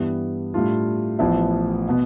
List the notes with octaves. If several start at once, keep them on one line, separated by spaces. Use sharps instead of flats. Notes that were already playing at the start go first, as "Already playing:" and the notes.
Already playing: G2 E3 G3 B3
A2 G3 D4 F4
A1 A2 F3 B3 E4
B2 B3